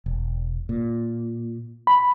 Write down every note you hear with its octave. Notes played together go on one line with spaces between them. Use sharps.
E1
A#2
B5